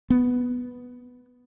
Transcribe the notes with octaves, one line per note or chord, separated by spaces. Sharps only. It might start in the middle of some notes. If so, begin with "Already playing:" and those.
B3